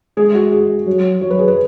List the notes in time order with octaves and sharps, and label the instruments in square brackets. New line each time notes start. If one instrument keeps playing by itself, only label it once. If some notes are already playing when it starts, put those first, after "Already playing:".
[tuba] G#3 [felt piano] G#4
[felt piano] F#4
G#4
[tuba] F#3
[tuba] F#3 [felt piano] C#5
[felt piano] B4
G#4
B4